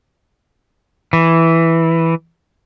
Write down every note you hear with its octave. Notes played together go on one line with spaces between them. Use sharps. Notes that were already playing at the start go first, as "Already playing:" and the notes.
E3